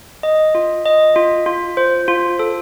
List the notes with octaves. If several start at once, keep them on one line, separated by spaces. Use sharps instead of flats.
D#5
F4
D#5
F4
F4
C5
F4
A4